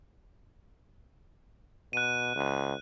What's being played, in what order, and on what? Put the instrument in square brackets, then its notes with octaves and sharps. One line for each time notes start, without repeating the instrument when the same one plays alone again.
[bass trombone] B2 [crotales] F#6 D#7
[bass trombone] C#2